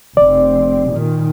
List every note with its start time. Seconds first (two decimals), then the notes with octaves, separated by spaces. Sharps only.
0.17 F1 C4 D5
0.92 A#2 D#3